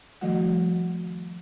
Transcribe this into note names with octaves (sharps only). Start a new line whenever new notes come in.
D#3 F3 G3 A3 F#4 F#5